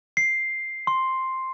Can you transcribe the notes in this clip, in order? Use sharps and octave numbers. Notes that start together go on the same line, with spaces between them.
C7
C6